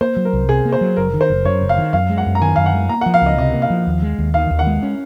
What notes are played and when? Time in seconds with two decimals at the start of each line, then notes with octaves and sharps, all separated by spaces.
0.01 A#3 C5
0.17 F#3
0.25 A#4
0.33 C2
0.49 C3 G#4
0.65 A#3
0.72 C5
0.81 F#3
0.97 F#1 A#4
1.14 D#3
1.21 C5
1.30 F#1
1.45 F#2 C#5
1.61 F#1
1.69 F5
1.78 D#3
1.93 F#2 F5
2.10 G#3
2.18 F#5
2.26 F#2
2.35 A#5
2.41 D#3 G#5
2.56 F#2 F5
2.66 F#5
2.74 G#3
2.89 A#3 A#5
3.01 F3 F#5
3.14 F5
3.22 C#2 D#5
3.38 C3 D#5
3.54 A#3
3.62 F5
3.70 F3
3.87 D#2
4.02 G#3
4.18 D#2
4.34 D#3 F5
4.51 D#2
4.59 F#5
4.67 G#3
4.83 C#4